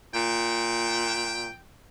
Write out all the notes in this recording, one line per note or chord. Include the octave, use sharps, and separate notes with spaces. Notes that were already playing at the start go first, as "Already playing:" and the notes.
A#2 G5